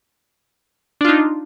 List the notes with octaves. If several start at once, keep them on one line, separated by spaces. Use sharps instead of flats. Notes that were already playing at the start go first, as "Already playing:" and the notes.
D4 D#4 F4